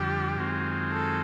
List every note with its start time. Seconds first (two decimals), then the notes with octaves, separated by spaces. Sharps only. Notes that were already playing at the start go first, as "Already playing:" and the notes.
Already playing: F2 D3 G3 G4
0.38 F#2 D#3 G#3 C4 F4
0.92 A4